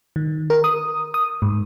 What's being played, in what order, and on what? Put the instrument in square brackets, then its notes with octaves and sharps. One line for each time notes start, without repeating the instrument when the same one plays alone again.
[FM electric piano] D#3
A#4
D#6
D#6
G#2